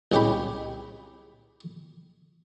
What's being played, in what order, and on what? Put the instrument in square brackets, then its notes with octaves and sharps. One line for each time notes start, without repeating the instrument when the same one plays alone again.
[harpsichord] C2 G#3 C#4 G4 G5 B5